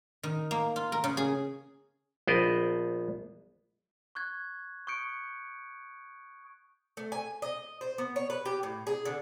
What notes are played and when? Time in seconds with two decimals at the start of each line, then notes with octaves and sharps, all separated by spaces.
0.23 D#3
0.51 A#3
0.76 F4
0.92 A#4
1.04 C#3
1.17 G#4
2.27 A#1 B3 C5 D5 D#5
4.15 C#6 F#6 G#6
4.87 C#6 D#6 F#6 G6 C#7 D7
6.97 A3
7.12 G#5
7.42 D#5
7.81 C5
7.98 B3
8.16 C#5
8.30 B4
8.45 G4
8.63 A2
8.87 G#4
9.05 D3